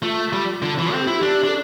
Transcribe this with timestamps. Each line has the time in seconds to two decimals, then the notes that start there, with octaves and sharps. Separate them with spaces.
0.02 A3 F4
0.33 G3
0.62 D3
0.78 E3
0.92 C4 A4
1.01 G4
1.07 E4 F4
1.16 G4
1.22 D4
1.44 D4
1.48 A4